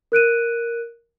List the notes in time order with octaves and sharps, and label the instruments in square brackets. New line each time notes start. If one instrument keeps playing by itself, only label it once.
[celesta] A#4 F#6 D7 D#7